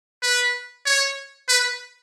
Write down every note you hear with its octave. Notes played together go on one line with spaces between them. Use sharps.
B4
C#5
B4